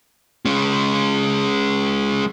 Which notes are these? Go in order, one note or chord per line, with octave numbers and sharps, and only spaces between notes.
G#3 C#4